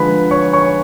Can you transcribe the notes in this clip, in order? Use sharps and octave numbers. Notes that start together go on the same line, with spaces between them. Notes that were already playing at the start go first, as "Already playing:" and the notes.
Already playing: D3 F3 G#3 B4 B5
C#5 C#6
C#5 C#6